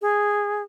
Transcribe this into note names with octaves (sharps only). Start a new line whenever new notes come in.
G#4